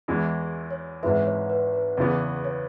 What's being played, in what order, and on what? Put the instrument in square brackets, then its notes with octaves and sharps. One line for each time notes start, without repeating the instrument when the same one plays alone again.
[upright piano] E2 E3 G#3 E4
[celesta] C#5
[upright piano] G#1 G#2 E3 G#3 [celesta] B4 E5
[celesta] C#5
B4
B4
[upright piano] E2 C#3 E3 B3 [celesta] B4
[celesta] C#5